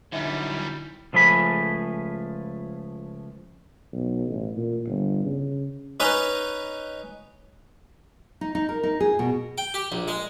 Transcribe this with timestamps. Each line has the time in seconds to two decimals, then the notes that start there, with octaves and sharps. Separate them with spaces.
0.12 F#2 D3 G3 D#4 E4
1.13 C#2 F3 A3 G#4 B5
3.92 B1
4.28 A1
4.57 A#2
4.86 G1
5.25 C#3
6.00 C#4 D#4 B4 D#5
8.41 D#4
8.55 D#4
8.69 A#4
8.83 D#4
9.00 G#4
9.19 B2
9.58 G5
9.74 G4
9.92 A#1
10.08 G#3